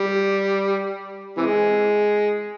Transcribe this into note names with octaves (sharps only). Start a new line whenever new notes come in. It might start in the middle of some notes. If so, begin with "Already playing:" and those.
Already playing: G3
C3 E3 G#3